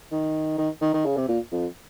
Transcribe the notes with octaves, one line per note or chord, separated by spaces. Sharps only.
D#3
D#3
D#3
D#3
C#3
C3
A#2
F2